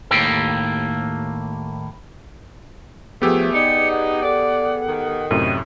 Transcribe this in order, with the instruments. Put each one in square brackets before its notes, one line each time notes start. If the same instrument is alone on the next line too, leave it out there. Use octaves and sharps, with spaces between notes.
[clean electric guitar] D#2 A2 A#3 G4 A4 G5
[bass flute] F3 [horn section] A3 [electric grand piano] B3 G4 G#4 [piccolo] E6
[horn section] D#4 [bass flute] D5 [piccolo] C#7
[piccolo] F#5
[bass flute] A4 [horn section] D5
[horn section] D#3
[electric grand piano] F#2 A2 C3 [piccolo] D#7